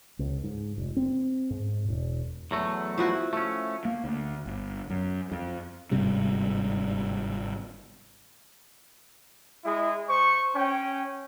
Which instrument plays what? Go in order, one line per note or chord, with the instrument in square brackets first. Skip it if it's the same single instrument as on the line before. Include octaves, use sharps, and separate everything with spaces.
[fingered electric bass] C#2
G#2
F1
C4
G#2
E1
[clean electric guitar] E2 F#3 A3
[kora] F3 E4 F#4
[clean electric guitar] A3 C#4
[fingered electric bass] A#3
D2
G1
F#2
F2
G1 G#2 C3 G3
[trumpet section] G#3 E4 G#4
C5 C#6
C#4 G5